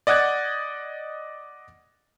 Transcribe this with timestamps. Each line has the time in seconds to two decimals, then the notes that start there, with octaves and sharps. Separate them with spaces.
0.07 D5 D#5 F#5 F#6 G#6 A6